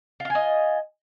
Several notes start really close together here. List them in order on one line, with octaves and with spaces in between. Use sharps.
F4 F5 G#5 D#5